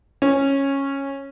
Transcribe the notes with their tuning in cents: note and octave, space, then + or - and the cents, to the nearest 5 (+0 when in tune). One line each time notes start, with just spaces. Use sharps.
C#4 -10